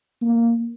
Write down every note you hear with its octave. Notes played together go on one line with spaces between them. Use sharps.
A#3